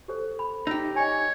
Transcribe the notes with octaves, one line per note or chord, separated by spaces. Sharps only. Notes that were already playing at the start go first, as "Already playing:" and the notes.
G4 A4 C5
B5
D#4 G4 E6
C#5 D#5 G#5